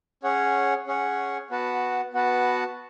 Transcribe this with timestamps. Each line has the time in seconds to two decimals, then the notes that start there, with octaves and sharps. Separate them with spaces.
0.23 C#4 G#4 C#5 F#5
0.87 C#4 G#4 C#5 F#5
1.51 B3 F#4 B4 F#5 A5
2.13 B3 F#4 B4 F#5 A5